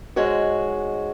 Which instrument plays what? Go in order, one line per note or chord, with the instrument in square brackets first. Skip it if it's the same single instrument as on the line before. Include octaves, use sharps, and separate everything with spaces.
[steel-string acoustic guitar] G#2 G#3 F#4 C#5